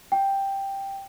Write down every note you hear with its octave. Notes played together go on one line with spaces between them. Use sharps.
G5